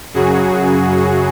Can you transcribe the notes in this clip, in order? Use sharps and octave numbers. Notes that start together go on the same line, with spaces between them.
F#2 C#3 F#3 F#4 G#4